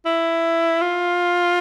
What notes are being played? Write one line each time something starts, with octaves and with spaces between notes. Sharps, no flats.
E4
F4